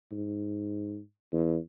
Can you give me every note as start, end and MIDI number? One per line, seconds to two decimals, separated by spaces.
0.12 0.99 44
1.32 1.57 40